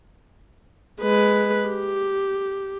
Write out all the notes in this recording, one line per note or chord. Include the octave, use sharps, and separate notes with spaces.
G#3 B4
G4